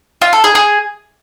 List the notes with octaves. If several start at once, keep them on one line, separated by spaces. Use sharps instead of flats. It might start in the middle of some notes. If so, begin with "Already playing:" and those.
F4
A4
G#4
G#4